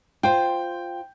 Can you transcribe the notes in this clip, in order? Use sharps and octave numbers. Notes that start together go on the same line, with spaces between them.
F4 C5 G5